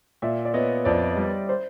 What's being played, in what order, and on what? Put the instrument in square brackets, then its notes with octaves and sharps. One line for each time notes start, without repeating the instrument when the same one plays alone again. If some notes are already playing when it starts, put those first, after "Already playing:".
[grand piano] A#2 [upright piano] D5 E5
[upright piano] D5
[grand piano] B3 [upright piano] C#5 D#5
[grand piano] F2 [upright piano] C5 D5
[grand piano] G3
[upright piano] C5